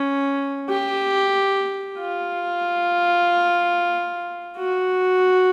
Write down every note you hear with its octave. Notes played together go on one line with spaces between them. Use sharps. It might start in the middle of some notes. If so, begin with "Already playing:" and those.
Already playing: C#4
G4
F4
F#4